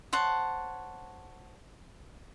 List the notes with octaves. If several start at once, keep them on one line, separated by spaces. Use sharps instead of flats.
C5 C#5 F#5 A5